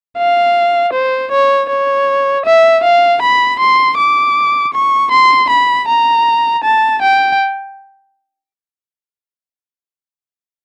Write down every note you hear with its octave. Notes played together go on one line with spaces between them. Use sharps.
F5
C5
C#5
C#5
E5
F5
B5
C6
D6
C#6
C6
B5
A#5
A5
G5